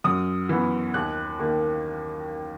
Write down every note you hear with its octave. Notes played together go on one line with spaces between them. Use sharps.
F#2 D#6
E3 B3
D#2 F#6
D#3 A#3